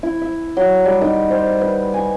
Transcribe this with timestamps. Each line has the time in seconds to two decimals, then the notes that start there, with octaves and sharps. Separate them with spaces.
0.03 E4
0.22 E5
0.57 F#3
0.85 G3
1.01 D#3
1.30 C5
1.61 B4
1.94 G#5